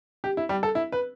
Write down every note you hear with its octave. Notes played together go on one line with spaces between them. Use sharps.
G4
E4
G3
A4
E4
B4